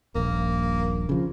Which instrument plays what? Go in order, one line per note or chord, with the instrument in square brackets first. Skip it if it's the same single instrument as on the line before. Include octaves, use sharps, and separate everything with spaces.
[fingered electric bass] D#1 A#1 [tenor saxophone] A#3
[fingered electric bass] C#3 F3